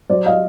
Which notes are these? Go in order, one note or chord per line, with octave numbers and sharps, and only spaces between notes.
F#3 C5 D5
D#5 F5